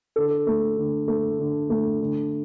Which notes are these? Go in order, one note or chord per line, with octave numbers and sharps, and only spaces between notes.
D3 A4
A3
D3
A3
D3
A3
D3